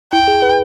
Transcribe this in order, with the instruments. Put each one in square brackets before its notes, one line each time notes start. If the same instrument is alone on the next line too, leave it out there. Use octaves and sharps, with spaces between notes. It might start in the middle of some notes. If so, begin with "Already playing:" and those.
[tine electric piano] E4 [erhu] G5
[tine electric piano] G#4
B4